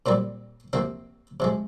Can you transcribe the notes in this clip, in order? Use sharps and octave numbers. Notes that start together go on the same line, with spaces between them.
A#2 G3 A#3 C4
C3 F3 A#3 C4
C3 F3 G#3